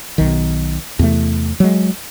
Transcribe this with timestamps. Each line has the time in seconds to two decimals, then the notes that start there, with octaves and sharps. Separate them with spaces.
0.18 B1 D#3
0.99 E2 C3 A3
1.60 F#3 G#3